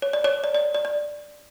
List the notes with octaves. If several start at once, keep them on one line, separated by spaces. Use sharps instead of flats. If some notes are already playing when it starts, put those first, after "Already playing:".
C#5
D5
C#5
D5
D5
D5
D5